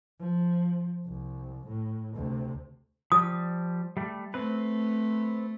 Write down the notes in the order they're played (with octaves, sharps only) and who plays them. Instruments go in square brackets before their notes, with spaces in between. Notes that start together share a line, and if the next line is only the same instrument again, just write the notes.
[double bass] F3
C2
A2
D2 C3
[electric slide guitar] F3 G3 [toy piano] D#6
[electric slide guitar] G3 A3
[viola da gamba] A3 [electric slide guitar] C4 B4